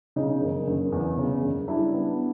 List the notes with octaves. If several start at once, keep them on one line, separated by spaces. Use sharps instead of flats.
C#3 D#4
F#1
F#1
E2
C#3
F#1
G3 D4 E4
B3